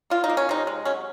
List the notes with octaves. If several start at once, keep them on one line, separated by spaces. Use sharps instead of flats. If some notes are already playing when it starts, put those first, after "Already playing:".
A#3 F4
D#4
A#3
C#4
C3 D#4
G#3
F#3 C#4